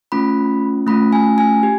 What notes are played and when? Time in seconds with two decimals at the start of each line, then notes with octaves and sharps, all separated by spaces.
0.12 A3 C#4 F4 B5
0.87 A3 C#4 F4 B5
1.13 G#5
1.38 G#5
1.63 G4